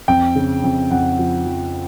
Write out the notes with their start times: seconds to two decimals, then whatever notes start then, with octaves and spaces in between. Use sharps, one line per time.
0.08 F2 G5
0.36 C#3
0.64 F2
0.91 F2 F#5
1.19 F3
1.46 F3